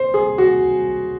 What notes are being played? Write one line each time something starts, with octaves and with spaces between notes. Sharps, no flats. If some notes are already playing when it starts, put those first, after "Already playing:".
Already playing: C5
G#4
F#4